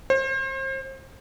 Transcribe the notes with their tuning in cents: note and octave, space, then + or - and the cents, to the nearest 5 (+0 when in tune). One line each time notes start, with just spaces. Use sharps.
C5 +35